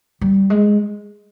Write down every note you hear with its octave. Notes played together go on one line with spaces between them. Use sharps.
G3
G#3